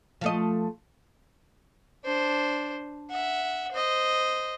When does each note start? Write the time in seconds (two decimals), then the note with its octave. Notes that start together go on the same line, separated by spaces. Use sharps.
0.21 F3 A3 D#5
2.05 D4 C5
3.10 E5 F#5
3.72 C5 D#5